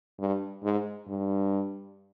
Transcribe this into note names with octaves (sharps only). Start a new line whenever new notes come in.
G2
G#2
G2